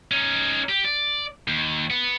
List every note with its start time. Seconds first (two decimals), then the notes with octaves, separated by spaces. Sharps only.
0.11 C#4 D#4
0.69 G4
0.85 D5
1.48 D#2
1.90 B3